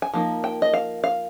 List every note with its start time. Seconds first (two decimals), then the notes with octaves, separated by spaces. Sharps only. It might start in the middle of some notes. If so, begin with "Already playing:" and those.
0.02 G#5
0.13 F3 A#3 D#4
0.44 G5
0.62 D#5
0.73 F5
1.04 F5